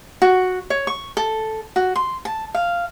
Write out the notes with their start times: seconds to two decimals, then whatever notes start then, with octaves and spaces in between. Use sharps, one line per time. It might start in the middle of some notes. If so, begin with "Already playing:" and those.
0.22 F#4
0.70 C#5
0.87 C#6
1.17 A4
1.76 F#4
1.96 C6
2.25 A5
2.55 F5